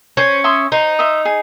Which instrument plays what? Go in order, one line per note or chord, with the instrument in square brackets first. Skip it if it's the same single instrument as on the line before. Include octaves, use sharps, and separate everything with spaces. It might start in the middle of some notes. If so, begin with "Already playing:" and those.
[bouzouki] C#4 [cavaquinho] C5
[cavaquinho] E5 C6 D#6
[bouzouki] D#4 [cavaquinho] C5
[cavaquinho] E5 C6 D#6
G#4